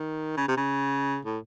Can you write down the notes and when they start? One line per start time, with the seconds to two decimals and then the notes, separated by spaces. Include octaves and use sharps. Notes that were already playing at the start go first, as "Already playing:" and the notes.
Already playing: D#3
0.37 C#3
0.48 C3
0.57 C#3
1.25 A2